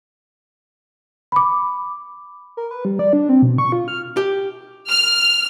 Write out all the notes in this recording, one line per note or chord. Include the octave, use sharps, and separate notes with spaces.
B5 D6
A#4
B4
G3
D5
D4
C4
B2
C#6
F4
F6
G4
F6